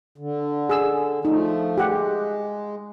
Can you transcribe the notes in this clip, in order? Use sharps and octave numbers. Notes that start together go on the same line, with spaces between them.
D3
G#4 E6
F3 A3 D#4
G#3 G4 F#5